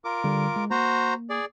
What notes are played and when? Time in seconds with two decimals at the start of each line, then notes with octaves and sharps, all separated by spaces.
0.05 F4 A#4 D6
0.24 D3 G3
0.56 G#3
0.71 A#3 F#4 C5 A#5
1.30 G#4 D5